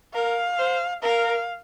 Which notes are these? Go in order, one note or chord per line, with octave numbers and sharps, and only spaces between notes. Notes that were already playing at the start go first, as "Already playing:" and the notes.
A#4 F5
C5
A#4 F5